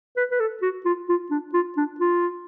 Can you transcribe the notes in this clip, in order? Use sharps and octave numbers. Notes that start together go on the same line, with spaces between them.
B4
B4
A4
F#4
F4
F4
D4
F4
D4
F4